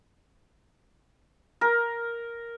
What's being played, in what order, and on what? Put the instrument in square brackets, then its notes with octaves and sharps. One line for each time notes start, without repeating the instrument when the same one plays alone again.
[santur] A#4